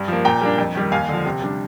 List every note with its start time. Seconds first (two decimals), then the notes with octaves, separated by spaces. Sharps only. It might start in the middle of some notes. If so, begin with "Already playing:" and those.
Already playing: G2
0.08 F3 A#3
0.25 A#2 G5 A#5
0.41 G3 A#3 D4
0.58 F2
0.75 D#3 G3
0.92 D#2 F5 G#5
1.09 D3 F3
1.26 C3
1.42 G3 D4